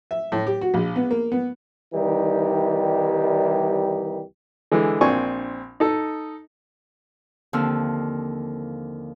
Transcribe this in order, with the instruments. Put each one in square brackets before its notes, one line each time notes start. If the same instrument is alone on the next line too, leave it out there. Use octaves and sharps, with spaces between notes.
[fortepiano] E5
A2
G4
F#4
A#1
B3
A#3
B3
[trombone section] C2 D#3 E3 G3 D#4 G4
[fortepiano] D3 E3 G#3
A#1 C4 D4 G#5 C#6
D#4 A4 D#5
[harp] D#2 D3 F3 C4 E6 F6